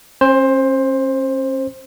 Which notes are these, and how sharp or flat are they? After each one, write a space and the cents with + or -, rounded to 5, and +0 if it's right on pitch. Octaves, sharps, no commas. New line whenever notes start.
C#4 -40 C5 +15